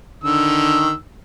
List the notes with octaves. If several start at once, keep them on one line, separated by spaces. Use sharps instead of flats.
D3 D#3 E6